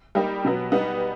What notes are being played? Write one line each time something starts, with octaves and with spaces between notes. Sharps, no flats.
G3 A#3 D#4 G4
B2 F#3 B3
G3 B3 D#4